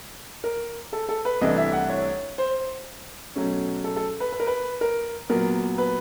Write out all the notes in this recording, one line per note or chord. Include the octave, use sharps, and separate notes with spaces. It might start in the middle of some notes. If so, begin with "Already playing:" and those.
A#4
A4
A4
B4
C2 C3 E3 A3 D4 D#5
E5
F#5
C#5
C5
B2 F#3 A3 C#4
A4
A4
B4
B4
A#4
B4
A#4
A#2 F#3 B3 A#4
B4